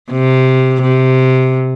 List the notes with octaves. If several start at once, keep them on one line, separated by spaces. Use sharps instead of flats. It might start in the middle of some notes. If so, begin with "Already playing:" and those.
C3
C3